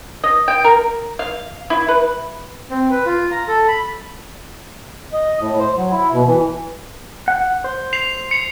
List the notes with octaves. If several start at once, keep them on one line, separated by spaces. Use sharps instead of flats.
D#5
G5
A#4
F5
E4
B4
C4
B4
F4
A#5
A4
B5
D#5
A2
C5
F#3
E4
B2
E3
F#5
C5
C7 F7
C#7 F7